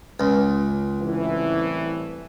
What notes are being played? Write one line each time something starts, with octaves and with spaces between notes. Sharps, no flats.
C#2
C2 A2 E3